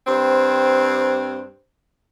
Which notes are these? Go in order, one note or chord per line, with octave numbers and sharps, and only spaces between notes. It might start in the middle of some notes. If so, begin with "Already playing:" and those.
G2 C4 C5